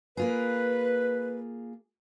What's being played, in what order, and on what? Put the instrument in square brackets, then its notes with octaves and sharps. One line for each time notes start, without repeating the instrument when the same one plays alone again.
[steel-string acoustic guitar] A#3 F4 G#4 [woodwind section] B4